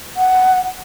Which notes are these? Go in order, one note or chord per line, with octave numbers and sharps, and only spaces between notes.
F#5